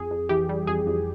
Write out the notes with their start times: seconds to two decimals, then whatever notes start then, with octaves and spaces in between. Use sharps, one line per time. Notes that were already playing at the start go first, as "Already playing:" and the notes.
Already playing: F2 G#4
0.11 F2
0.29 E3 G4
0.49 G3
0.67 F2 G#4
0.87 F2